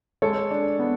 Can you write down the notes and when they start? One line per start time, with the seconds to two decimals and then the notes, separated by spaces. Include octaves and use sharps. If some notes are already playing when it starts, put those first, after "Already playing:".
0.22 G#3 A4 C#5
0.51 D4
0.79 B3